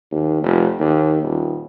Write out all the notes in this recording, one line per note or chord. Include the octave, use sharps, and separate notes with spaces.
D#2
F1
D#2
D#1